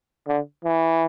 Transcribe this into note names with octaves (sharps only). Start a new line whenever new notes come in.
D3
E3